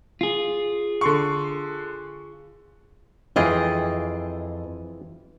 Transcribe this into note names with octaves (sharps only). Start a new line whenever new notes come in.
F4 G#4
D3 C6 C#6
F2 E3 F4 G#4 D#5 G5